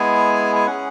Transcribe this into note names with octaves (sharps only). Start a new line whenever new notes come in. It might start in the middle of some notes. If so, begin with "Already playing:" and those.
Already playing: G#3 B3 E4 G#4 G#5
G#5
C#4 G#4 F#5